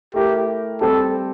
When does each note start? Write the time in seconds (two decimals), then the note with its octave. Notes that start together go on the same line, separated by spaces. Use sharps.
0.14 A3 E4 G4 A#4
0.80 G3 C4 G4 A4